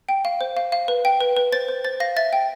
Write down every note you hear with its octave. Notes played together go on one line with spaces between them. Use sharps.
G5
F5
C5
F5
F5
B4
G5
B4
B4
C5 A6
C5
C5 A6
F5 A#6
E5 A6
G5